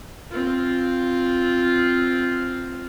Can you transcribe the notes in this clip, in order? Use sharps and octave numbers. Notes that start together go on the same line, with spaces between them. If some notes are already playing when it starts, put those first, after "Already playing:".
C4 F4